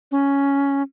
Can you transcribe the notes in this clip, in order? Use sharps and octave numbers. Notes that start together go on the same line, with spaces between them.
C#4